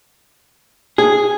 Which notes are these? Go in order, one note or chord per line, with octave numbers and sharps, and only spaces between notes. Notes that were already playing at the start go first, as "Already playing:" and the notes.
G#4